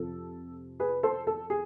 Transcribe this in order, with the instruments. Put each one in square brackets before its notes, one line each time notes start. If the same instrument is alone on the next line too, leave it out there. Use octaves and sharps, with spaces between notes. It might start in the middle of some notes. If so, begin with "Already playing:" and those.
Already playing: [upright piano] F2 C3 F3 A4
G#4 B4
A4 C5
A4
G#4